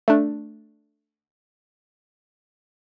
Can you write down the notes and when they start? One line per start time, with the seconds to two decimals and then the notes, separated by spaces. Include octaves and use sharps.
0.08 A3 D4